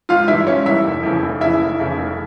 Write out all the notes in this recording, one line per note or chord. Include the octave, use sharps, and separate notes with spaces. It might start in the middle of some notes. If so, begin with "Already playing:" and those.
G#1 F4 F5
G2 E3 E4 E5
G#1 C#4 C#5
G2 E3 E4 E5
F1
F2 C#3 E3
F1
F2 C#3 E3 E4 E5
F1
F2 C#3 E3
F1